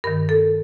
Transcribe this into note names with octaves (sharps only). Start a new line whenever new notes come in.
G2 D#3 A#4
A4